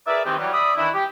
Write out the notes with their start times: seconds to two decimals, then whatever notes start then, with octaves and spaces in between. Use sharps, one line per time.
0.07 G#4 A#4 B4 D5 E5
0.25 D#3 E3 C4 D#4 G4
0.38 E3 F#3 G3
0.53 D5 E5 B5 D#6
0.76 D#3 E3 D4 E4
0.94 G4